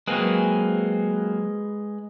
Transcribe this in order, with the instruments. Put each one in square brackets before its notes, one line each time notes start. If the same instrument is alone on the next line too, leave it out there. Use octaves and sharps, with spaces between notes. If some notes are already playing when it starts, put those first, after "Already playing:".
[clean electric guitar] F#3 A#3 C4 [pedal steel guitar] G#3 B4 G#5